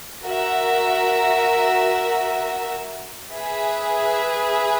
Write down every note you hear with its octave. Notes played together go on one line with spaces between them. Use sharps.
F#4 A#4 E5
G#4 B4 E5